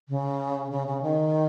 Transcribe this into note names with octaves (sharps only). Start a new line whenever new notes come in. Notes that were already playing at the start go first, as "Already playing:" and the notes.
C#3
C#3
C#3
D#3